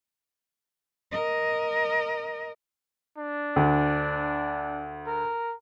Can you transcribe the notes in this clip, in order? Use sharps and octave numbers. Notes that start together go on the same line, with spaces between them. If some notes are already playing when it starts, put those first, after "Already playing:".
A#4 D#5
D4
D2
A#4